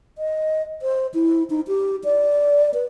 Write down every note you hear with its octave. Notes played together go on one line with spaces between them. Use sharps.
D#5
C5
E4
D#4
G4
D5
B4